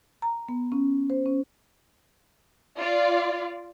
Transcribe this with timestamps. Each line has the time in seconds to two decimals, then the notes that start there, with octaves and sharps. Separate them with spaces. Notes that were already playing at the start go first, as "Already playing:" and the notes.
0.22 A#5
0.49 B3
0.72 C#4
1.10 C5
1.26 C#4
2.79 F4 D5